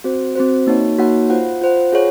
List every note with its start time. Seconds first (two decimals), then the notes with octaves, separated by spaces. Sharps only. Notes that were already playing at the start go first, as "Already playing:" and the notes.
0.04 C4 F#4 C5
0.36 C4 F#4 C5
0.67 A#3 D#4 F#4 C#5 F#5
0.98 A#3 D#4 F#4 C#5 F#5
1.30 F4 C5 F#5
1.61 F4 C5 F#5
1.93 F4 G#4 C#5 F#5